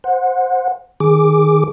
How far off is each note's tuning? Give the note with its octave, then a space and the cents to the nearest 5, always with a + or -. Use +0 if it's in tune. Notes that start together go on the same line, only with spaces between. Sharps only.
C5 +5 F#5 -25
D#3 +0 G#4 +0 D6 +0